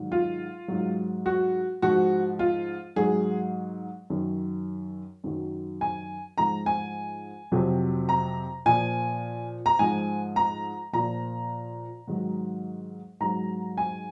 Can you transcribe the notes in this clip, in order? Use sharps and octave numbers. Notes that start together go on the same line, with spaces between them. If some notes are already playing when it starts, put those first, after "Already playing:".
Already playing: G#2 D#3 F#3
F4
G#2 F#3
F#4
G#2 F3 F#4
F4
G#2 F#3 G#4
F#2 D#3 F#3
F#2 D#3 F#3
G#5
G#2 F3 A#5
G#5
F2 C3 F#3
A#5
A#2 F3 G#5
A#5
G#2 F3 G#5
A#5
A#2 F3 A#5
G#2 D#3 F#3
G#2 F#3 A#5
G#5